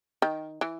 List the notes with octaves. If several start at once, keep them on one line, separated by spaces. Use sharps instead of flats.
D#3
E3